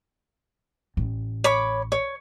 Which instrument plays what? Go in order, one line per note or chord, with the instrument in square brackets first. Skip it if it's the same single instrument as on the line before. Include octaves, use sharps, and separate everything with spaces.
[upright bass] A1
[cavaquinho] C#5 B5 D6
C#5